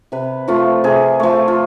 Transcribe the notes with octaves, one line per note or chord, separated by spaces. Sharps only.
C3 B4
F3 A3 F4
C3 G#4
F3 A3
F4